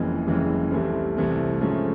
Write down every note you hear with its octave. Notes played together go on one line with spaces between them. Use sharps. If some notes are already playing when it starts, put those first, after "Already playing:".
Already playing: F#1 F2 C#3 E3 G#3
F#1 F2 C#3 E3 G#3
C2 C3 E3 A3 C4
C2 C3 E3 A3 C4
G#2 F3 A3 C#4